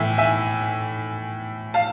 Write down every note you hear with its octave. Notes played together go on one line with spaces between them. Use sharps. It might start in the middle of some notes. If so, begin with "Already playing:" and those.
Already playing: A2 E3 E5 G#5
E5 G#5
F5 A5